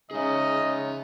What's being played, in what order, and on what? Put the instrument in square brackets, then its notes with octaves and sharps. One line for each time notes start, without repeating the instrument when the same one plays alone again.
[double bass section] C#3 [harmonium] G#3 C#4 D#4 [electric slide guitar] G#4 E5 [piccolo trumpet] D#5